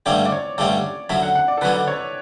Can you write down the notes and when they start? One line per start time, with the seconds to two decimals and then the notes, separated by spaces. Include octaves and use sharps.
0.06 G2 D3 A3 C#4 G4 D5
0.26 D5
0.32 C#5
0.58 G2 D3 A3 C#4 G4 D5
1.09 D3 F#3 C#4 E5
1.23 F#5
1.35 F#5
1.48 D5
1.57 A4
1.61 D3 F#3 C#4 B4
1.77 D5
1.88 C#5